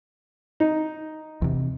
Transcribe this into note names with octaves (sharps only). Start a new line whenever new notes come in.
D#4
E2 C3